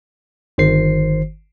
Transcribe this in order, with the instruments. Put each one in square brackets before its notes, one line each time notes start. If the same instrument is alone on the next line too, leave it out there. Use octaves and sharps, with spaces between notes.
[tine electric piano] G1 D#3 C5 C7